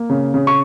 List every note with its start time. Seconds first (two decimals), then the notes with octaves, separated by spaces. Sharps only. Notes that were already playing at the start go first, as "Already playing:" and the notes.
Already playing: A#3
0.10 C#3
0.34 C#3
0.47 C#6